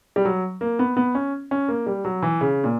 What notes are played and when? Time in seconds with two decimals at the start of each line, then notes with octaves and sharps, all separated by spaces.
0.16 G3
0.25 F#3
0.61 A#3
0.79 B3
0.97 B3
1.15 C#4
1.51 C#4
1.68 A#3
1.86 G3
2.05 F#3
2.22 E3
2.41 C#3
2.64 A#2